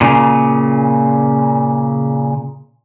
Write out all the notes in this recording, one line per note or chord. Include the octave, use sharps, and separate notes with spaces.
A#2 C#3